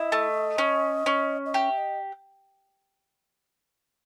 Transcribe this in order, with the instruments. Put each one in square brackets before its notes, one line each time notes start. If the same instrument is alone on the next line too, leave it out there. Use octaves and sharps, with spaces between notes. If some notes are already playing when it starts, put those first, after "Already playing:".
Already playing: [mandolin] E4 [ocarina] D#5
[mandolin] A3
C#4
C#4
[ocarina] D#5
[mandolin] G4 [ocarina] E5
[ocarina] D#5